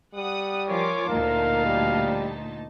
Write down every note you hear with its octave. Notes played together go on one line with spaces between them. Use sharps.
G3 F#5 D#6
F3 F4 A#4 C#5 G#5 D6
D2 A#2 D#4 A#4 F5 A5
G3